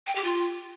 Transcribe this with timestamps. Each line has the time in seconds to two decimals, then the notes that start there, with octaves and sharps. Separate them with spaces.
0.07 G5
0.15 G4
0.24 F4